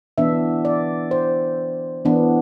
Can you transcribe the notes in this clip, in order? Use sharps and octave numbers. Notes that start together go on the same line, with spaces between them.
E3 B3 D4 E5
D5
C5
E3 B3 D4